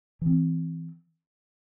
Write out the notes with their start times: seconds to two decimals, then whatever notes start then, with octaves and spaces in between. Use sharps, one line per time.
0.22 E3 C4